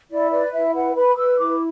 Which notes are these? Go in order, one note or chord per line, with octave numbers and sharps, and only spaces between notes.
E4 D5
B4 D5
E4 E5
B4 F#5
B4 B5
B4 E6
E4 D6